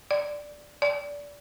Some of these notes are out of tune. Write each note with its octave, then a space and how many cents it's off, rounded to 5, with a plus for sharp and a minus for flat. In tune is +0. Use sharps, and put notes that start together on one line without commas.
D5 +0
D5 -20